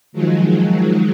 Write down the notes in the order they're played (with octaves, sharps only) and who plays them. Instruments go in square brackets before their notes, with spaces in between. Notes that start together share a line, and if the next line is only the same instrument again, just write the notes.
[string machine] D#3 F3 F#3 G#3